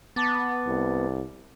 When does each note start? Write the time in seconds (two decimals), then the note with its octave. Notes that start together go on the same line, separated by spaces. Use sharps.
0.16 B3 A5 D6 A6
0.67 C2